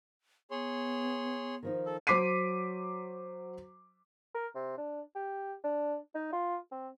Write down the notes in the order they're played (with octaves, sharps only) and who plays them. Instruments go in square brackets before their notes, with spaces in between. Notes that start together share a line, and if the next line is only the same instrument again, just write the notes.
[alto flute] B3 [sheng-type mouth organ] G#4 C#5 C6
[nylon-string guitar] D#3 F3 D#4
[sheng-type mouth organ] A4
[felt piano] F#3 C5 D6 B6 C7 D#7
[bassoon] A#4
C3
D4
G4
D4
D#4
F4
C4